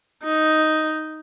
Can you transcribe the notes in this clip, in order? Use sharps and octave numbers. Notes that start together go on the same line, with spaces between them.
D#4